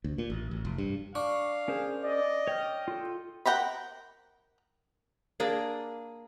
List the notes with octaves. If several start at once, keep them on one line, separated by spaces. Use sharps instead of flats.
D2
A#2
A1
A1
F1
G2
D4 F5 C#6
C#4 G#4 A#4 C5
D5 D#5
C#5 G5 F6
F4 A4
A#4 F#5 G5 A#5 B5
A#3 D4 G#4